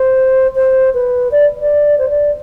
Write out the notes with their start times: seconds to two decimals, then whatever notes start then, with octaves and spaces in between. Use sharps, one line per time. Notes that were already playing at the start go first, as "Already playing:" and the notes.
Already playing: C5
0.55 C5
0.94 B4
1.31 D5
1.60 D5
1.98 C5
2.09 D5